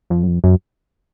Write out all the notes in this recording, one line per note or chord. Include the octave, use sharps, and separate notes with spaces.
F2
F#2
F2
F#2